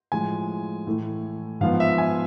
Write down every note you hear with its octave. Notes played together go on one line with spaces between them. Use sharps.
A2 F3 G#3 G#5
A2 E3 A3
G#2 F3 B3 F5
E5
G#5